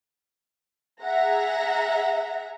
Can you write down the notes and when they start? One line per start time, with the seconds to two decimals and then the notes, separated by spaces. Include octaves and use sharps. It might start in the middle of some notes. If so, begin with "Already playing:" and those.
1.02 G#4 E5 F#5 A#5